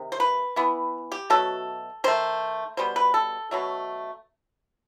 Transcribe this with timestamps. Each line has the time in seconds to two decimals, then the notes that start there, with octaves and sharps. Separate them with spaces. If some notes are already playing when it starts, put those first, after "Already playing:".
Already playing: C3 D#3
0.12 C5
0.20 B4
0.56 E3 B3
1.12 G4
1.30 B2 F#3 A3 A4
2.04 D#3 A3 C5
2.77 B2 G3 B3 C5
2.96 B4
3.14 A4
3.51 B2 F#3 A3